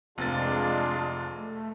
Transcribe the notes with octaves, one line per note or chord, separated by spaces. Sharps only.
F1 G#3 C4 D4 F4 A6
A3